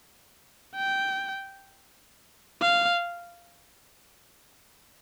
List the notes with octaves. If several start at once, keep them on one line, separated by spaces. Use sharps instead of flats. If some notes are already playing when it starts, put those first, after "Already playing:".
G5
F5